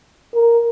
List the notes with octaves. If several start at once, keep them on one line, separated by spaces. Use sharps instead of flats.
A#4